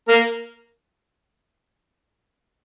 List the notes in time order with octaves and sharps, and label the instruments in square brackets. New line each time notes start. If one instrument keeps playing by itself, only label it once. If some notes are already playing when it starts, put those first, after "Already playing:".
[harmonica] A#3 A#4